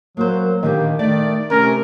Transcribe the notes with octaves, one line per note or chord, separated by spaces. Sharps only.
F#3 A#3 A#4 C5
A#2 D3 D#3 A#3 G4
D#3 A3 D#4 D5
C3 A3 C#4 A#4